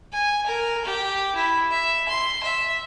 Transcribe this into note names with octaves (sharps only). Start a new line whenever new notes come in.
G#5
A#4
G4
E4
E5
C6
E5